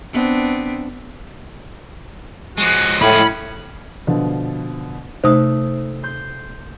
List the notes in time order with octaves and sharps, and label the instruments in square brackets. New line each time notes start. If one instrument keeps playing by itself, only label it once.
[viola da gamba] B3 C4 D4
[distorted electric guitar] F3 G#3 [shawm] F#4
[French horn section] A2 [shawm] C#4 [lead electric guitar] B5
[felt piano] B2 D3 F3
[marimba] C3 D#4 [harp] A3 [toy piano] C5 D#6
[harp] C6 G6